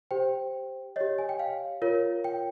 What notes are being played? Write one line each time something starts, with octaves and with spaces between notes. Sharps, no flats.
G4 C5 G5
G4 C#5 D#5
G#5
G5
F5
F4 A#4 C#5
G5